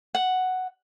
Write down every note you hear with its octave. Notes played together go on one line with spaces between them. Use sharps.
F#5